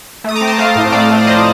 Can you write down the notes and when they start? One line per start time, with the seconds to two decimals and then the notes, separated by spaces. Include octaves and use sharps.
0.24 A3 D#6
0.35 A#5 D6
0.41 C4
0.47 A5 C6
0.58 A3 F5 A5
0.76 A2
0.92 A3 D5 F5
1.11 A3
1.19 F5
1.26 F3 C5 D#5